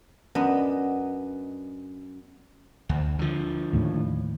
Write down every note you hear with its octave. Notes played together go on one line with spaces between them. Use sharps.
F#2 B3 D4 D#5
D2
D3 F3
D#2 A2